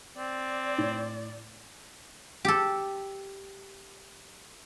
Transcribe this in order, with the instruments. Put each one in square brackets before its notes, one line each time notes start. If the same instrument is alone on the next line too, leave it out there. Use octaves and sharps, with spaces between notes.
[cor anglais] C4 [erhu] D5
[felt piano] A2
[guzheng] G4 A4